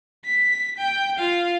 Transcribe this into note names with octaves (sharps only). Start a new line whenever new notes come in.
B6
G5
F4 F5